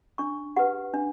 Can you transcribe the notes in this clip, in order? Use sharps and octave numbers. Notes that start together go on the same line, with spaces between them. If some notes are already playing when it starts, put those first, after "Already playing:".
D4 C#6
G4 B4 F#5
D4